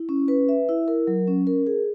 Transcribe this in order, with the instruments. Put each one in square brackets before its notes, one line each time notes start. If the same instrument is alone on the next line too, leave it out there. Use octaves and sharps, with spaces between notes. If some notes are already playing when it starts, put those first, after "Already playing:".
Already playing: [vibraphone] E4
C#4
B4
E5
E4
A#4
F#3
C#4
A#4
G#4